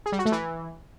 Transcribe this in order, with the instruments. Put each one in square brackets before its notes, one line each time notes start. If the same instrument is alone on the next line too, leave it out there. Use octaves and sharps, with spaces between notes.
[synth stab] G#4
G3
F#4
A3
E3